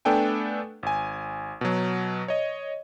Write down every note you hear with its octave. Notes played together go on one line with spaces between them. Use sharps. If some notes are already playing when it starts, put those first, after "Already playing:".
A3 B3 D4 A4 G5 G#5
G#1 G#5
B2 F#3
C#5 D#5